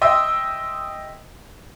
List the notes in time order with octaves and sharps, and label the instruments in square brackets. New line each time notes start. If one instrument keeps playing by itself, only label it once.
[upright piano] D#5 E5 G5 C6 D#6 E6